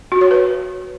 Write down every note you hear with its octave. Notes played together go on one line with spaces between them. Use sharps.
F#4
C#5
B4